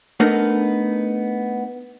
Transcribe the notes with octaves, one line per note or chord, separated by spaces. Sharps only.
A3 B3 D4 D#4 A4 A#4